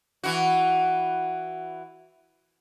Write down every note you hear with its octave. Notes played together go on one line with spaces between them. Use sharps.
E3 F#4